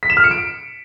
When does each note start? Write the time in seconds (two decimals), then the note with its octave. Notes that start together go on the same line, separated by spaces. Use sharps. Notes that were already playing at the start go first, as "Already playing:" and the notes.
0.03 B6
0.10 E7
0.17 F6
0.24 C#7
0.31 D7